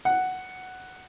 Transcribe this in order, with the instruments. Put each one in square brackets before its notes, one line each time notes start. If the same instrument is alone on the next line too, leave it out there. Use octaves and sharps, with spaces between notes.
[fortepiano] F#5